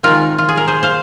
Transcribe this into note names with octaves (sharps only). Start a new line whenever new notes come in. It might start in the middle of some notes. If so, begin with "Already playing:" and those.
D#3 G#3 C4 F4 A#4
F4
G#4
A#4
G#4 C5
C5 F5